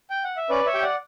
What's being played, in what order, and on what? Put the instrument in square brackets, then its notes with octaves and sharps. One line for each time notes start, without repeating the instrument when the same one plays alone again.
[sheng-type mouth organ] G5
F#5
E5
C#4 B4 D5
C#5 E5
G4 G5
D5 F#5